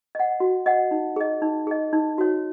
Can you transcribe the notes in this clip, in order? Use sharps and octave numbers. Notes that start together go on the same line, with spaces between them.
D#5 F#5
F#4
D#5 F#5
D#4
G#4 D#5
D#4
G#4 D#5
D#4
F#4 C#5